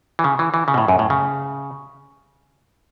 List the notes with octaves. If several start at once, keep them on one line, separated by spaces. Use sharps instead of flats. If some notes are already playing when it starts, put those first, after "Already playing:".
E3
C#3
E3
E3
C#3
B2
A2
F#2
A2
C#3